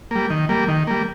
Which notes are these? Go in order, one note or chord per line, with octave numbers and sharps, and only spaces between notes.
G3 A#3
D#3
G3 A#3
D#3
G3 A#3